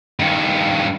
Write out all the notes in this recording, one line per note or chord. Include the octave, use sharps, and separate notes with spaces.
G2 D#3